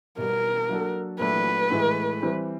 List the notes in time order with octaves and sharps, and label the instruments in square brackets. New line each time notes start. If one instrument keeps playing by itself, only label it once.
[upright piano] B2 G3 B3 [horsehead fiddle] A#4
[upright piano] F#3 A#3 D4 F#4 A4
[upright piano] A#2 F#3 A3 D4 [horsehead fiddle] B4
[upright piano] A2 E3 G#3
E3 G3 C4